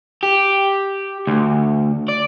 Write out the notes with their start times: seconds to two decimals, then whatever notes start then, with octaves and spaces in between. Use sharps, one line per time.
0.23 G4
1.27 D2
2.09 D5